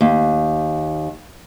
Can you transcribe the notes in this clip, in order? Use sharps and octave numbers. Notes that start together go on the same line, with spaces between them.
D#2